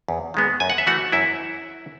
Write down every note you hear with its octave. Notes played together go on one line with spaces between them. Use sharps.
E2
D#3 G#3 B3
F#2 G#5
F#5
E5
E3 A3 F#4 F#5
F#2 E4 E5